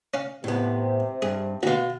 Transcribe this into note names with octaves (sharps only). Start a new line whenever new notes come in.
C#4 F5
A2 C3 B3
G2 G#4
D2 B2 F#4 F5